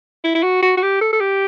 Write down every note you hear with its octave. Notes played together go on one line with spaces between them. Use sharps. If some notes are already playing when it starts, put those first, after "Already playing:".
E4
E4
F#4
F#4
F#4
G4
A4
A4
G4